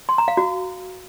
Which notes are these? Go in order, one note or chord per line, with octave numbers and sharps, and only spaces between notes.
C6
A#5
F5
F#4